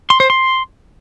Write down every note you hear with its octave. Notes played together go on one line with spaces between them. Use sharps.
C6
C5
C6